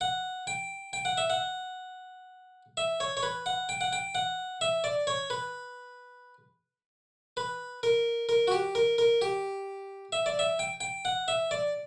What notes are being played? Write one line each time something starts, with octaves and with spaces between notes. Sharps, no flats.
F#5
G5
G5
F#5
E5
F#5
E5
C#5
C#5
B4
F#5
G5
F#5
G5
F#5
E5
D5
C#5
B4
B4
A#4
A#4
F#4
G4
A#4
A#4
G4
E5
D5
E5
G5
G5
F#5
E5
D5